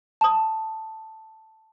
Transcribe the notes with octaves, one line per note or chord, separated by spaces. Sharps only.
A5 D#6